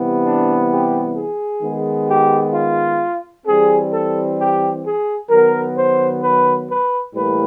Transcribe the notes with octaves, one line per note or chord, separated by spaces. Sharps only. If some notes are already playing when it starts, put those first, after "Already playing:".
Already playing: C3 E3 G3 B3
D4
G4
G#4
D#3 G#3 B3
G4
F4
E3 G3 C4 G#4
A4
G4
G#4
D#3 F#3 B3 A#4
C5
B4
B4
A2 E3 G3 A#3 B4